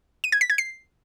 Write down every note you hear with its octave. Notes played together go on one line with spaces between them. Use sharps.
D#7
G#6
B6
G#6
C7